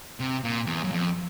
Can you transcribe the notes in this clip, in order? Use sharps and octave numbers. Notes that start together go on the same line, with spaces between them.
C3
A#2
E2
F#2
F2